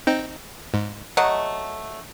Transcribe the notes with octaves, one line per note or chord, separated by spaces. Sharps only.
C4 D#4 G5
G#2
F#3 A3 D#5 F#5